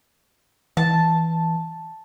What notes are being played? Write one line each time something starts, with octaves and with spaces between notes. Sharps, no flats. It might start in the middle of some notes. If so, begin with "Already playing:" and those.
E3 A5